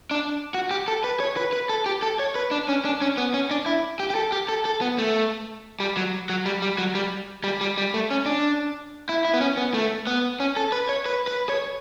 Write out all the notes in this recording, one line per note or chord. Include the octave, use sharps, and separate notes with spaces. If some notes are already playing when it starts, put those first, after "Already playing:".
D4
F#4
G4
A4
B4
C#5
B4
B4
A4
G4
A4
C#5
B4
D4
C#4
D4
C#4
B3
C#4
D4
E4
G4
G4
A4
G4
A4
A4
B3
A3
G3
F#3
F#3
G3
G3
F#3
G3
G3
G3
G3
A3
C#4
D4
E4
E4
B3
C#4
B3
A3
B3
C#4
A4
B4
C#5
B4
B4
C#5